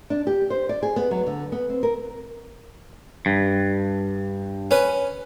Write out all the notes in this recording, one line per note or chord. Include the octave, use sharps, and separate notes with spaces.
D4
G4
C5
D5
G#4
B3
F#3
D3
B3
C4
A#4
G2
C#4 B4